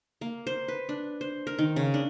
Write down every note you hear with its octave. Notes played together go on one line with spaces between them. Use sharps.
A#3
C5
B4
D4
C5
A#4
D#3
C#3
D4